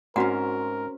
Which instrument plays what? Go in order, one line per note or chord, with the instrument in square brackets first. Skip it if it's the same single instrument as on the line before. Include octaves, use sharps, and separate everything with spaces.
[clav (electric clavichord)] G#2 [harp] C4 C#4 [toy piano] F#4 F#5 [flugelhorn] A#4